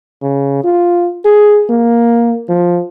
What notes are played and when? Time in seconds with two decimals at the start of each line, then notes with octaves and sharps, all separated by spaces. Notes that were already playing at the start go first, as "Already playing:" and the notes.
0.22 C#3
0.64 F4
1.25 G#4
1.69 A#3
2.49 F3